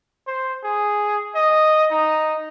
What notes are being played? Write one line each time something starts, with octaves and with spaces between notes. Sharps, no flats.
C5
G#4
D#5
D#4